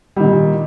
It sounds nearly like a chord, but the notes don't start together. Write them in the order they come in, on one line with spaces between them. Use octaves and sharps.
G3 D#3 A#2